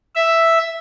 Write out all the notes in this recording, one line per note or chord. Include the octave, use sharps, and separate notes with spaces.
E5